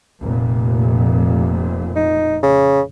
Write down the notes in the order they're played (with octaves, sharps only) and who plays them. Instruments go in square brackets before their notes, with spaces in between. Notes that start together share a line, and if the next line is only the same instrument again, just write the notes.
[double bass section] F1 A#2
[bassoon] D#4
C#3